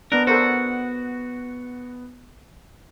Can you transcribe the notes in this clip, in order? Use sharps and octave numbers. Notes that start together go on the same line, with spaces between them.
B3 D4 A#4 F#6
F#4 A4 A#4 C5